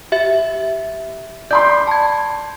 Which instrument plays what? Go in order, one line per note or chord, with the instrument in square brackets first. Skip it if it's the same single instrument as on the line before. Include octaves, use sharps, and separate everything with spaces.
[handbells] G4 E5 A6
[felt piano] D5 B5 C6 [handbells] G6
[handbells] A5 G#6